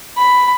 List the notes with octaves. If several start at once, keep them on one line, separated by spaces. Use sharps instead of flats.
B5